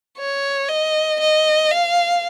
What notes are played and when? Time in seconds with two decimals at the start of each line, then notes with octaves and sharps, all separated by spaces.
0.18 C#5
0.69 D#5
1.21 D#5
1.71 F5